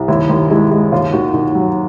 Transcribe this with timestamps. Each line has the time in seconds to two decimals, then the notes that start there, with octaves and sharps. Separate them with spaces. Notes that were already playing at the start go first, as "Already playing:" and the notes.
Already playing: C2
0.08 D#2 E4
0.30 D#2
0.50 G#3 E4
0.71 G#3
0.92 D#2 F4
1.13 D#3 F#4
1.34 D#3
1.55 F#3